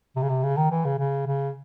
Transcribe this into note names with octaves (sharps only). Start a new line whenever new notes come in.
C3
C#3
C3
C#3
D#3
E3
C#3
C#3
C#3